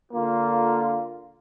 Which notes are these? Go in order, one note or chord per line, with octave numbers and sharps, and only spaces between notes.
D3 A#3 F4